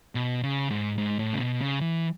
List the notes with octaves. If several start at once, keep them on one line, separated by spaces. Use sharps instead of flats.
B2
C#3
G#2
G#2
A2
C#3
B2
C#3
E3